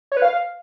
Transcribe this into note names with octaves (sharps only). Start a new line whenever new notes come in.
C#5
B4
F5